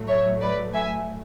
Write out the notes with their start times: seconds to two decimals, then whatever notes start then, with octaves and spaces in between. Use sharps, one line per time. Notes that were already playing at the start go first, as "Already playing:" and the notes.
Already playing: A2 F#3 A3
0.08 C#5 E5
0.41 B4 D5
0.74 E5 G#5